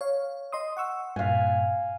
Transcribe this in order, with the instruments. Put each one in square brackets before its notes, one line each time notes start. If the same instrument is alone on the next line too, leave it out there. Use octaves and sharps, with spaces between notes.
[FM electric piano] C#5 F5
D#5 C6 D#6
F#5 C#6 E6
[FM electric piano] G2 A#2 [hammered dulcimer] F5 G#5